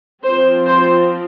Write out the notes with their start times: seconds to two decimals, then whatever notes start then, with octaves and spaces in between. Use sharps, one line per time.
0.23 F3 C4 C5
0.66 C5